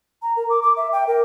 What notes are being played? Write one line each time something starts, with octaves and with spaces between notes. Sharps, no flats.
A#5
A#4
D6
D6
E5
G5
A#4